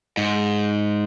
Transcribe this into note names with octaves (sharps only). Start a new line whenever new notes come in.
G#2